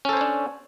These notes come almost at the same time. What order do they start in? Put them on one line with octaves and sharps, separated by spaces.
C#4 A4 C5 C#5 D4